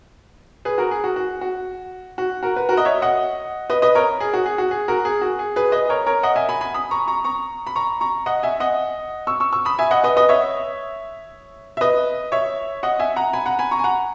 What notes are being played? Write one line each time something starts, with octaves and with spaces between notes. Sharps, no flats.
G#4 B4
F#4 A#4
G#4
F#4
F#4
F#4
F#4
F#4 A#4
B4
F#4 A#4
D#5
C#5 E5
D#5 F#5
B4 D#5
B4 D#5
A#4 C#5
G#4
F#4
G#4
F#4
G#4
F#4 A#4
G#4
F#4
G#4
G#4 B4
B4 D#5
A#4 C#5
A#4 C#5
D#5 F#5
E5 G#5
G#5 B5
G#5 B5
B5 D#6
A#5 C#6
A#5 C#6
A#5 C#6
B5
A#5 C#6
A#5 C#6
D#5 F#5
E5 G#5
D#5 F#5
C#6 E6
C#6 E6
C#6 E6
B5 D#6
E5 G#5
D#5 F#5
B4 D#5
B4 D#5
C#5 E5
E5
B4 D#5
C#5 E5
D#5 F#5
E5 G#5
F#5 A#5
G#5 B5
F#5 A#5
G#5 B5
A#5 C#6
G#5
F#5 A#5